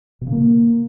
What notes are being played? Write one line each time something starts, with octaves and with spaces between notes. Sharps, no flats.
B2
C#3
A#3